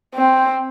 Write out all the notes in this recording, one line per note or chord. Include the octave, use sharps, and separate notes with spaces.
C4